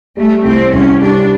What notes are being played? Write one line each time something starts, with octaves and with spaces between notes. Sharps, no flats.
G3 A3
C2 C4
C2 C#4
G3 D4